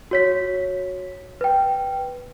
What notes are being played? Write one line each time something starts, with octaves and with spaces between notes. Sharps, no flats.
F#4 C#5 B6
B4 G5